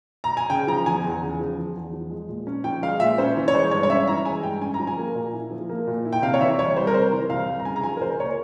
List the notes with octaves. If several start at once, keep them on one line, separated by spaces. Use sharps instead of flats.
A#5
G#5
C#3 G5
F3 A#5
E2 G#5
E2
C#3
F3
E2
E2
F3
G#3
A#2
C#4
F3 G5
G#3 F5
A#2 E5
C#4 C5
E3
C#5
G#3 C5
G2 C#5
C#5
C#4 E5
E3 A#5
G#3 G#5
G2 G5
C#4 G#5
A#5
F3
G#5
A#3
A#2
E4
F3
A#3
A#2
E4
G5
C3 F5
C#5
E3 E5
C2 C#5
G3 C5
A#4
C3 C5
E3
C2 F5
G3
A#5
C#3 G#5
A#5
F3 G#5
A#4
C#2 C5
A#3 C#5